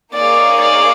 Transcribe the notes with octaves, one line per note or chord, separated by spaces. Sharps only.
A#3 D#4 G#4 C#5 D5 F5
D5